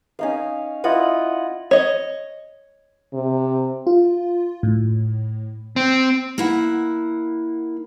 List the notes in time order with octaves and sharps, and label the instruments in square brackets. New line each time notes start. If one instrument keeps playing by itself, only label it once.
[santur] C#4 D#4 F5
E4 F4 D#5 F#5
[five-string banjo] C#5 D#5
[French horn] C3
[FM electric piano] F4
A2
[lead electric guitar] C4
[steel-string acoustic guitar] A#3 E4 F#5